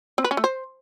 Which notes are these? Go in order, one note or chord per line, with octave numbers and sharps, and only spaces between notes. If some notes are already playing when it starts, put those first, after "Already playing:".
C4
B4
C#4
A3
C5